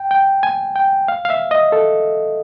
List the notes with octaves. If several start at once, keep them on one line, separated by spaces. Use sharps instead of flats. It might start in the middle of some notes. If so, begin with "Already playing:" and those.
Already playing: G5
G5
G#5
G5
F5
F5
E5
D#5
A4